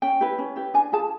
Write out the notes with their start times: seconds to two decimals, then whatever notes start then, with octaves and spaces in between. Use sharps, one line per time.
0.02 C#4 G5
0.21 E4 G4 B4
0.38 C#4
0.56 E4 G4 B4
0.74 D4 G#5
0.92 F4 G#4 A5